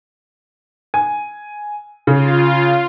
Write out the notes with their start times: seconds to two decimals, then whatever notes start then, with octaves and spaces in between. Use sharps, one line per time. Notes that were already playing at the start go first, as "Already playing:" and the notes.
0.94 G#5
2.07 C#3 F4